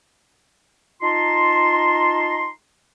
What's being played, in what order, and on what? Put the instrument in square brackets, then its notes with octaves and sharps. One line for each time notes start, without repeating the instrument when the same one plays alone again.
[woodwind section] D#4 F4 A5 A#5 C6